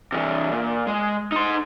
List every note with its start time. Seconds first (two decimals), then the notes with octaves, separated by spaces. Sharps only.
0.12 C3 E3
0.52 A#2
0.87 G#3
1.32 D#4 C6